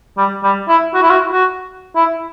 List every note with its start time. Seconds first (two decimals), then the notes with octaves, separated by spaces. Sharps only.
0.17 G3
0.43 G3
0.68 E4
0.94 F#4
1.02 E4
1.10 F#4
1.32 F#4
1.96 E4